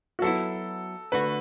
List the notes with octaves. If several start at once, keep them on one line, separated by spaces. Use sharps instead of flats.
F#4
F#3 B3 E4 A4
D3 A3 F#4 B4